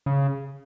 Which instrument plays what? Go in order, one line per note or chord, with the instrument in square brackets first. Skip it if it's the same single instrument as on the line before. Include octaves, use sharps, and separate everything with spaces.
[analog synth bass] C#3